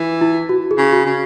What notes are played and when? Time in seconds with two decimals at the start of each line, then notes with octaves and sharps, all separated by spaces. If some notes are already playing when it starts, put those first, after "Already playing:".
Already playing: E3
0.21 E4
0.49 F#4
0.71 G#4
0.78 C#3
0.92 F#4
1.06 C#3